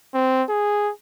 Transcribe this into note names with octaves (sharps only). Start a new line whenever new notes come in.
C4
G#4